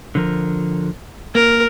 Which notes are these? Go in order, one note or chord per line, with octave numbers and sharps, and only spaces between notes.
D3 F3 A#4
A#3 A#4